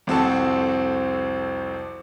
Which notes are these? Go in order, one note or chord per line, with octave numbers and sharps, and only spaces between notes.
C2 F2 C4 F#4 A4 A5